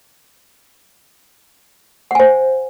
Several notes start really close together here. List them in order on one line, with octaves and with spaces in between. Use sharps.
F#5 G#5 C5